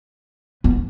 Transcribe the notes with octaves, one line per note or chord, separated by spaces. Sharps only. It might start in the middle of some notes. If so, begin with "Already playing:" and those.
B3